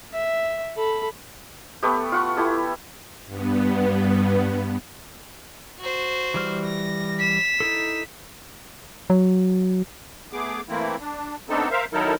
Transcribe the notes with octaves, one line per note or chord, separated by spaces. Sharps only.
E5
A4 B5
A3 B3 G4
F4 F#5 C#6
E4 G4 A4
G2 B3
F#4 C5
E3 G3 F6
A#6
B6 E7
D#4 E4 A4
F#3
A3 B3 G#4 D6
E3 A3 A#3 C4 E4
D4
A3 B3 C4 D4 D#4 A4
A#4 C5 E5 F5
D#3 F#3 D#4 E4 A4 A#4